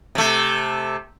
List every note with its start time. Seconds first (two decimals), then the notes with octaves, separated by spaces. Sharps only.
0.15 C3 A3